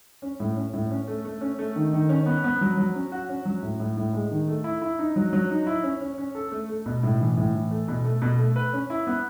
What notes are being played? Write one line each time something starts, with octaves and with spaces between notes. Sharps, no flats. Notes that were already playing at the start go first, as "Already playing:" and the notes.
C#4
A2
C#4
A2
C#4
A3
A3
C#4
A3
D#3
D#3
C#4
B3
B3
F#3
F#3
C#4
F#4
C#4
F#3
A2
A2
A2
G#3
D#3
A3
E4
E4
D#4
F#3
F#3
D#4
E4
C#4
C#4
C#4
A4
A3
A3
B2
A2
E3
A2
E3
A3
B2
A3
B2
A3
B4
C#4
E4
B3